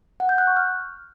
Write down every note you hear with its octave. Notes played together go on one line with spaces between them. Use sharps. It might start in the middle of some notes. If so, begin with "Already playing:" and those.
F#5
G6
F#6
C#6
F6